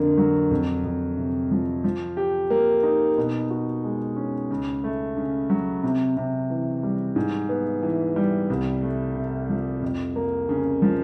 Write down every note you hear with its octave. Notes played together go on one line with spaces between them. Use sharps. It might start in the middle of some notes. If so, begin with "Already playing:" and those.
Already playing: F2 D3 A#3
F#3
F2
F2
C3
F3
F3
G4
A#3
D#4
B2
F#4
G#3
C#4
C#2
A3
C#3
F#3
C3
C3
E3
G3
G#2
B3
E3
G3
C2
A3
C3
F3
F2
A#3
C#3
F3